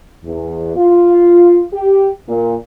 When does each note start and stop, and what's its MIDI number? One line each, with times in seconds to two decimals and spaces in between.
0.25 0.75 40
0.77 1.62 65
1.73 2.09 67
2.29 2.55 46